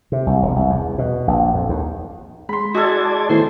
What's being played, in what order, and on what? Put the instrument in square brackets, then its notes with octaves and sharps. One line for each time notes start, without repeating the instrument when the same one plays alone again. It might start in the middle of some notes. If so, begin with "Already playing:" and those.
[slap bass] C3
C2
E1
C2
E2
B2
A#1
F2
D#2
[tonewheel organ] G#3 [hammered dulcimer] B5 C6
[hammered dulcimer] G#3 A4 [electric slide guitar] F#4 G#4 [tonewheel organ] D5 A5 G#6
[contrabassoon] A2 [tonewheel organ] D#3 B3 C6 [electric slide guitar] C5